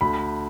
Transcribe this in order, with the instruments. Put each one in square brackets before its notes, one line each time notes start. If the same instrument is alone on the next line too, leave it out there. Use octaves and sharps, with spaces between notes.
[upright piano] D2 B5